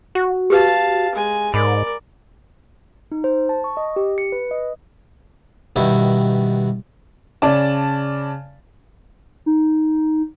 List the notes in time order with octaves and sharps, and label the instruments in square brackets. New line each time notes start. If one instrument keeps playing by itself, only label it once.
[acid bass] F#4
[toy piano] G4 B4 [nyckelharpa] F5 A5
[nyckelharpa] G#3 G#5
[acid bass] G#2 [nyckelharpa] A#4 D5 [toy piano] B5
[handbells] D#4
C5
A5
C#6
D#5
G4
C#7
B4
D#5
[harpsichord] G2 B2 D#3 E4 G4
[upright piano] C#3 D5 A5
[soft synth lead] D#4